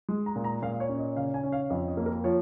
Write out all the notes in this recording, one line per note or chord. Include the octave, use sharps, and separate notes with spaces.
G#3
A#5
A#2
A#5
A#2 F5
C#5
C#4
D#5
C#3 F5
G#5
C#4
F5
F2 D#5
D#5
A#3
A#4
F3 C#5